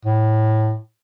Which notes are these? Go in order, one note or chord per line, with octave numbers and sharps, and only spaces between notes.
A2